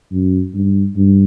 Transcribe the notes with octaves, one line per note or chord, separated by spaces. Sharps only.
F#2
G2
G2